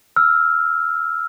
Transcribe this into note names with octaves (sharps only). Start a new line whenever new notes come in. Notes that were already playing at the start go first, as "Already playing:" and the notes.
E6 F6